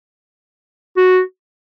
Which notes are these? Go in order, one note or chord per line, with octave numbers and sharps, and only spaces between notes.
F#4